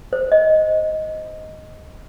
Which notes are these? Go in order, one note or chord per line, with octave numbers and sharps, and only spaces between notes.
C5
D#5